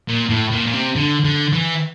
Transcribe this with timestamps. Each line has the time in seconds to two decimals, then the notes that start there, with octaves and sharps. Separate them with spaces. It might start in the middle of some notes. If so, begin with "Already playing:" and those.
0.08 A#2
0.30 A2
0.52 A#2
0.67 A#2
0.74 C3
0.96 D3
1.25 D3
1.53 E3